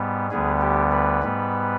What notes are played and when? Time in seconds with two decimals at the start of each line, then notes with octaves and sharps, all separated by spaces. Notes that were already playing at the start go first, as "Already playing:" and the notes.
Already playing: G#2 G3 B3
0.30 D2 D3 G3 B3 G#4
0.62 G4
0.92 B4
1.23 G#2 G3 B3